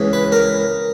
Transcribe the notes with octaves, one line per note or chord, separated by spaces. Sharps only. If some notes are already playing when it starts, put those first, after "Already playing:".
Already playing: C#2 C#3 E3
B4
A#4